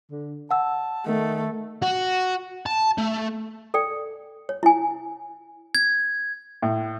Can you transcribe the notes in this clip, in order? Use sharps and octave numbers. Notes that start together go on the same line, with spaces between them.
D3
F#5 A5 E6
D#3 A3
F#4
A5
A3
A4 D5 G5
C#5
E4 G#5
G#6
A2